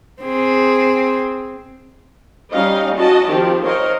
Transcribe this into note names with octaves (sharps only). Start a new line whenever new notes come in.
C4 G#4
G3 C#4 D#4 D#5 F5
C#4 E4 F#4 D#5 A5
D#3 F3 C4 G4
A#4 C5 C#5 D#5 F5